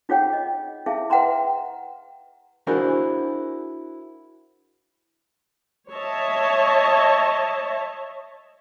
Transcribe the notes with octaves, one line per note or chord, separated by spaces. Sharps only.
D#4 F4 G#4 C#5 F#5 G5
D#5
E4 G#4 E5 F5 A5
B4 E5 F#5 G5 A#5 C6
D4 E4 F#4 G#4 A#4 C5
C#5 D#5 E5 A5